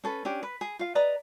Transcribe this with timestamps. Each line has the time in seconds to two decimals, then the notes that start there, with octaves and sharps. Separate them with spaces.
0.04 C#4 A4 B4
0.25 C#4 D4 G4
0.43 B4
0.61 G#4
0.79 F4 F5
0.95 B4 D5 D#5 A#5